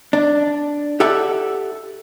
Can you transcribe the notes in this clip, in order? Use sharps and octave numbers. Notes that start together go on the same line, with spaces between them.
D4
G4 A4 E5 F#5